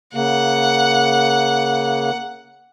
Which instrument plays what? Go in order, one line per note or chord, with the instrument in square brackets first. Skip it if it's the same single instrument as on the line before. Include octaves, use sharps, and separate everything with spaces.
[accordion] C#3 A#3 [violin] F#5